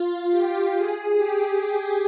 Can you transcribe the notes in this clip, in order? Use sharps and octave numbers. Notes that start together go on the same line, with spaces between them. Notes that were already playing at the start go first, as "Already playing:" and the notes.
Already playing: F4
G4
G#4
G4